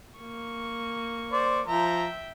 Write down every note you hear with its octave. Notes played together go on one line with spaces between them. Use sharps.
A#3 C#6
C5 D5
F3 E5 G5 A#5